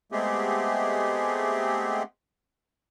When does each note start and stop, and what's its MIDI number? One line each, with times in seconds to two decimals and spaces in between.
0.12 2.03 56
0.12 2.03 57
0.12 2.03 59
0.12 2.03 60
0.12 2.03 67
0.12 2.03 68